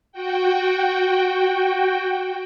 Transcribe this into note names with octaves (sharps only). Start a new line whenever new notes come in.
F#4 G5